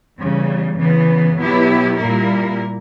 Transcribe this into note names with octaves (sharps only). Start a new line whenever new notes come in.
E2 C#3 G3
E2 C#3 E3 B3
B2 F#3 B3 E4 G4
A#2 G3 A#3 E4 A#4